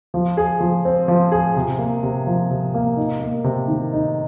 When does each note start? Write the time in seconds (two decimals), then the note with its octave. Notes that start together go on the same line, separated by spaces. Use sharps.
0.14 F3
0.37 G#4
0.60 F3
0.85 C4
1.08 F3
1.32 G#4
1.56 C3
1.79 A#3
2.03 C3
2.27 F3
2.50 C3
2.74 A#3
2.97 D#4
3.20 A#3
3.44 C3
3.68 D#3
3.93 D#4